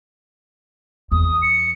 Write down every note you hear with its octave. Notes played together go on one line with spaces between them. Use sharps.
E2 D#6
C#7